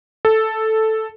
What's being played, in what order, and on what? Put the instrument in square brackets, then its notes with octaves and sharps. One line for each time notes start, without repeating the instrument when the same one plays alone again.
[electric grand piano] A4